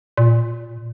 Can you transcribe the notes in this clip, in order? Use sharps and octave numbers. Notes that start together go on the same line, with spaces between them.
A#2